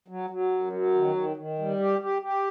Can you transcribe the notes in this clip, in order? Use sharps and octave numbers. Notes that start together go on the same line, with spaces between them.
F#3
F#3
F#2
F#3
D#3
D#3
D#3
G3
G4
G4
G4